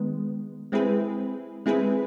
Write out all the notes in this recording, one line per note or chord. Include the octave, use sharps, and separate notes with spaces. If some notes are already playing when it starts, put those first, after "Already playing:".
Already playing: D#3 G#3 B3
G#3 C4 E4 G#4 B4
G#3 C4 E4 G#4 B4